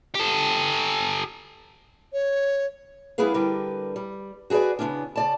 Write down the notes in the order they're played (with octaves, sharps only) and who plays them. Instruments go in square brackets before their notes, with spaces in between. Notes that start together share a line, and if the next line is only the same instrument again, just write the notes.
[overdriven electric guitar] G4 A4
[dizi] C#5
[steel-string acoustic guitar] G3 B3 E4 G#4 B4 F5
D3 G3 G4 A#4 B4
G3
F#4 G#4 A4 B4 D5
C#3 A#3 B3 C#4 D4
C#3 D5 A5